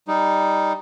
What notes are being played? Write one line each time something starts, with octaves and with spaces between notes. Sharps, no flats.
G3 D#4